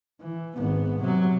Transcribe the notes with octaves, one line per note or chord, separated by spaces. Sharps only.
E3
G#1 B3
C3 F#3